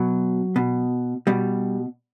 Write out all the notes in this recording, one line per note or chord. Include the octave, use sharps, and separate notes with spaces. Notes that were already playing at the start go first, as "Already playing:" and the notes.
Already playing: B2 F#3
B2
B2 G3